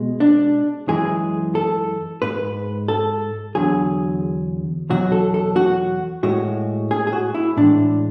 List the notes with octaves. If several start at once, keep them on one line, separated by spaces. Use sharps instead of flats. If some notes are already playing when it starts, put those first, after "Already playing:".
Already playing: B2 G#3
D4
F#2 E3 G#3 G#4
A4
G#2 G#3 B4
A4
E2 D3 F#3 G#4
E2 B2 F#3 F#4
A4
A4
F#4
A2 G#3 F#4
G#4
G#4
F#4
E4
A2 E3 G#3 D4